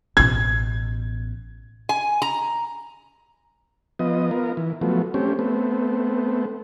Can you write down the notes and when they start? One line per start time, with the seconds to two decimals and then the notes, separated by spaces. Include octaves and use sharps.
0.17 A1 B2 G#6
1.89 G#5
2.22 A#5
3.99 F3 B3 D#5
4.31 B3 F4 A#4
4.57 E3
4.81 F3 F#3 A3 B3
5.14 A3 C4 C#4 G4
5.39 A3 B3 C4